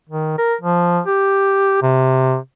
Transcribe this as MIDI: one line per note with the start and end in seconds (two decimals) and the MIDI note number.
0.09 0.35 51
0.38 0.55 70
0.61 1.01 53
1.07 1.78 67
1.82 2.37 48